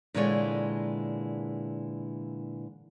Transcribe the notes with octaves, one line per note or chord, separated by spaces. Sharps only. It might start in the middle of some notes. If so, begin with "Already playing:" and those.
A#2 D3 E3 G#3 C#5 D5